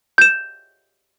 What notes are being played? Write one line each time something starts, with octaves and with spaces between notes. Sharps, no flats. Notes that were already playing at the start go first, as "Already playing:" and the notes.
G6 E7